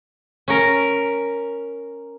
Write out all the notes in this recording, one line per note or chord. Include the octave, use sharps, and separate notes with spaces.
C#4 A#4